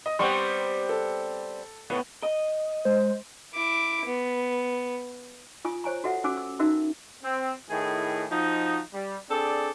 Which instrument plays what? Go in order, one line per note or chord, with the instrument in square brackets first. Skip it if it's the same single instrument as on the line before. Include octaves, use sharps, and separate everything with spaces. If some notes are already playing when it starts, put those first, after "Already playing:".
[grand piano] D#5
[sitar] G3 B3 C4 [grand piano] C6 C#6
[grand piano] A4
[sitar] A2 [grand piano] B3
[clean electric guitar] D#5
[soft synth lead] G#3 [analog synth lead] C5
[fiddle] E4 D6
B3
[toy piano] F4 G#5 D#6
C5 C#5 G#5 A#5
F#4 A4 E5 F#5
C#4 F#4 G#5 D6 E6
E6
C#4 D#4 F#4 A#4 E5 E6
[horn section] C4
A2 D#3 E4 G#4
F3 D#4 F#4
G3
C4 D4 G#4 A4 D5